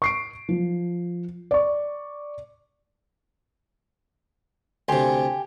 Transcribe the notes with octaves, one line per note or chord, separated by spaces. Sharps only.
C#6 C7 D7
F3
D5 C#6
D2 C3 G4 G#5 C6